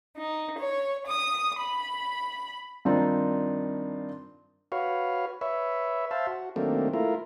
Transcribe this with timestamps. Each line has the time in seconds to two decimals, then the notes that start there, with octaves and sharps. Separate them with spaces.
0.17 D#4
0.58 C#5
1.07 D#6
1.59 B5
2.85 G2 D#3 C4 D4 D#4 F4
4.72 F#4 B4 C#5 F5
5.41 B4 C#5 E5
6.11 C5 E5 F5 A5
6.27 F#4
6.56 D#3 F#3 A3 A#3 C4 D4
6.93 A3 E4 F4 A#4